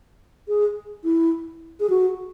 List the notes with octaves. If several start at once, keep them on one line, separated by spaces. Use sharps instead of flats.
G#4
E4
G#4
F#4